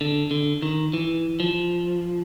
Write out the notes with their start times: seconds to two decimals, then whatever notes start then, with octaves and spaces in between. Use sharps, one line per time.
0.01 D3
0.31 D3
0.62 D#3
0.93 E3
1.40 F3